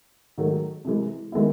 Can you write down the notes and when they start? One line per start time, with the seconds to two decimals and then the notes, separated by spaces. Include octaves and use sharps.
0.38 G#2 D#3 F#3 A3
0.85 C3 E3 G#3
1.32 D#3 G#3 B3 E4